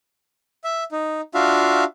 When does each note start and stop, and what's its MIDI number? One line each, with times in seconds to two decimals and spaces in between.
0.64 0.84 76
0.92 1.21 63
1.34 1.84 62
1.34 1.84 65
1.34 1.84 66
1.34 1.84 76
1.34 1.84 77